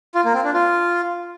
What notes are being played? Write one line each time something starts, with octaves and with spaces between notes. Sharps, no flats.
F4
A#3
C4
D4
F4